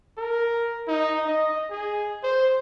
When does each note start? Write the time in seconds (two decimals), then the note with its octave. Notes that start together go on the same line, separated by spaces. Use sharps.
0.18 A#4
0.88 D#4
1.27 D#5
1.70 G#4
2.23 C5